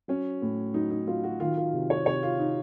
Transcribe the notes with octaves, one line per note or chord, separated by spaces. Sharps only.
F#3 C#4
A2
F#3 D#4
D#4
F#3 F4
F#4
D#3 F4
F4
C3
C#5
C3 C#5
F4
D#4